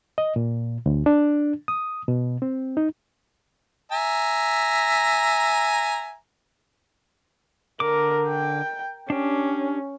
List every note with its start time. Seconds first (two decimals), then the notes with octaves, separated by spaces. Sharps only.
0.18 D#5
0.36 A#2
0.86 D2
1.06 D4
1.68 D#6
2.08 B2
2.42 C4
2.77 D#4
3.92 E5 G#5 A#5
7.80 D3 A#4 D6
8.28 G5
9.10 C#4 D4 G4